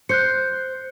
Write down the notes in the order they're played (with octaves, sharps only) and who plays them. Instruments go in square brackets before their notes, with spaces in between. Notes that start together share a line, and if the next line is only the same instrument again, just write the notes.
[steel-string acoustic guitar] C5 [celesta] F#6 G6 C#7